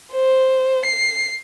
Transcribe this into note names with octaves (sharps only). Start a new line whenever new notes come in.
C5
C7